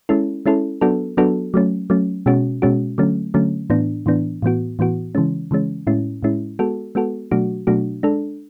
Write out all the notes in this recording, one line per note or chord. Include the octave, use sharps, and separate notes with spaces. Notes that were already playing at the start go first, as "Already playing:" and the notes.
G#3 C#4 E4 A4
G#3 C#4 E4 A4
F#3 B3 D4 F#4 A4
F#3 B3 D4 F#4 A4
F#3 A3 C#4
F#3 A3 C#4
B2 G#3 C#4 F#4
B2 G#3 C#4 F#4
D3 F#3 A3 C#4
D3 F#3 A3 C#4
A2 E3 B3 D4
A2 E3 B3 D4
A2 E3 B3 F#4
A2 E3 B3 F#4
C#3 E3 G#3 C#4
C#3 E3 G#3 C#4
A2 G#3 C#4 E4
A2 G#3 C#4 E4
G#3 B3 F#4 A4
G#3 B3 F#4 A4
B2 F#3 A3 D4 F#4
B2 F#3 A3 D4 F#4
G#3 D4 A4